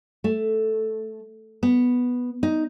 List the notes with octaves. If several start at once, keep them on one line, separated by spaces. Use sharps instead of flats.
A3
B3
D#4